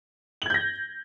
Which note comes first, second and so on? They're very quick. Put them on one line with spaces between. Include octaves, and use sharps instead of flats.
F#7 G#6 G6 A#6